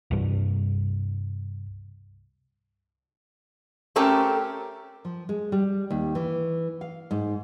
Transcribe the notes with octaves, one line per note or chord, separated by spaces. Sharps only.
C2 G2
A3 C4 C#4 G4 A4 A#4
F3
G#3
G3
D#2
E3
F5
G#2